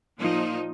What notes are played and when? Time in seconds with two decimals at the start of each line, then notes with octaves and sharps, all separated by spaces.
0.19 A#2 F3 A#3 D#4